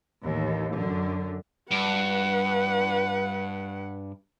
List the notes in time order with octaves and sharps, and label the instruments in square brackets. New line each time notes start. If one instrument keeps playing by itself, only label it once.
[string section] A1 D#2
F#2 D3
[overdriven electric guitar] G2 [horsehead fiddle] B4 F#5